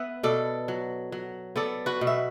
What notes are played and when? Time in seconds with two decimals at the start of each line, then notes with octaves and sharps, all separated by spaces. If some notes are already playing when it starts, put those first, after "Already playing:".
Already playing: B3 B4 E5
0.23 B2 A4 D5
0.68 F#3
1.12 F#3
1.56 B3 A4 D5
1.86 F#4 B4
2.01 B2
2.07 E5